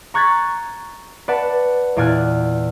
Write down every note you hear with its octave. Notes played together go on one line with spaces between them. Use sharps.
A#5 C#6 F#6 G#6 A6 B6
B4 D5 F#5 A5
E2 A#2 D5 G#5 F6 F#6